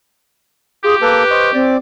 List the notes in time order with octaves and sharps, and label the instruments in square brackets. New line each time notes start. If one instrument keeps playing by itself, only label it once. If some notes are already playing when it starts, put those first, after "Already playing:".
[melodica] F4 [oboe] G4 [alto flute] G#4
[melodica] A#3 A4 [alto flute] B4
[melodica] C5 D#5 C#6
[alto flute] C4 [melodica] D5 D6